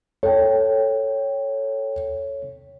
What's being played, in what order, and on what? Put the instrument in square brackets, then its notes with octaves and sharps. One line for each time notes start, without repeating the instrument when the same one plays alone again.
[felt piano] A4 G5 [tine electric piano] C#5